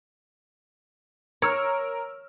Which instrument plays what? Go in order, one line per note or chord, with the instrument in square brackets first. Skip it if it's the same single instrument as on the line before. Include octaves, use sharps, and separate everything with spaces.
[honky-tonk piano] A#4 E6 F6 [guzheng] C#5